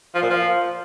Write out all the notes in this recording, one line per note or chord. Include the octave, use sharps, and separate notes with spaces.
F3
A#2
F3